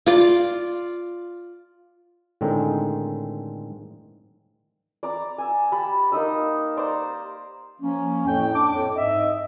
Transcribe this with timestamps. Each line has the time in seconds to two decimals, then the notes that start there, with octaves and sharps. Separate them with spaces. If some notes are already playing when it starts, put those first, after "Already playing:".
0.06 F4 D5
2.41 A2 D3 D#3 G#3 C4 D#4
5.03 D5 A#5 D6
5.38 G#5 E6
5.72 G4 A5 B5
6.12 A#3 D#4 D#5 E6
6.77 C5 D5 A#5
7.81 F3 A#3 C#4
8.27 F2 A2 G5
8.54 D4 D6
8.72 F2 A2
8.96 G#2 D#5 E5